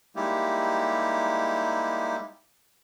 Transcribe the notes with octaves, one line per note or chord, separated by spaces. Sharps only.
G3 G#3 A#3 D#4 E4 G4